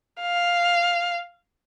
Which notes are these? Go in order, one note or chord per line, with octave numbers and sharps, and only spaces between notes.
F5